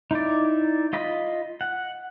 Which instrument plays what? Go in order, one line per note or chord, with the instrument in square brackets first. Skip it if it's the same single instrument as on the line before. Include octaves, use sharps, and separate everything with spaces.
[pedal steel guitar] D#4 E4 D5
F4 D#5 B5
F#5